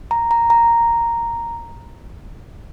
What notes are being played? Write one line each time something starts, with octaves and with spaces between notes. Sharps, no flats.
A#5
A#5
A#5